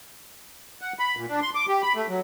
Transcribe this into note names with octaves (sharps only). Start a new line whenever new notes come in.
F#5
B5
A#2
D4
C6
D6
G4
B5
A3
F#3